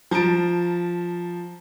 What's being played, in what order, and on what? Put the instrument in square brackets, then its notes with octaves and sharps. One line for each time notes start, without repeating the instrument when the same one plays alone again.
[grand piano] F3 A5 A#5 D7